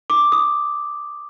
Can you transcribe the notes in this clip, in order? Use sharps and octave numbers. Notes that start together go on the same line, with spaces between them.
D6
D#6